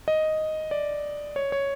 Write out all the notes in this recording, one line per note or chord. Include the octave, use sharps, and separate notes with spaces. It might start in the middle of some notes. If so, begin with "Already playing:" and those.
D#5
D5
C#5
C#5